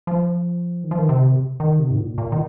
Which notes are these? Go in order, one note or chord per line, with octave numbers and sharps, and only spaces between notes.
F3
D#3
F3
D#3
C3
D#3
C3
G#2
A#2
A#2
D#3